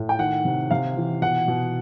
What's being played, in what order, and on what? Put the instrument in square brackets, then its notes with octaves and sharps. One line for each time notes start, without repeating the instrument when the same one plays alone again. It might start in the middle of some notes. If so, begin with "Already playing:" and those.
Already playing: [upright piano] A2
G5
D#3 F#5
C3
C3 F5
E3
B2 F#5
B2